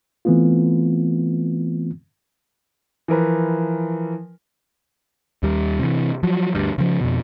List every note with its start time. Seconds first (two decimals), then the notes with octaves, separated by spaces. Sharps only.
0.25 E3 A3 B3 C4 F4
3.08 E3 F3 A#4 B4
5.43 D#2 G3
5.79 C3 E3
6.23 F3 F#3
6.55 D2 G2
6.78 C#3 F3
7.01 F2 B2